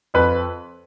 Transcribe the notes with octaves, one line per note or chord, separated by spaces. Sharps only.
F2 B4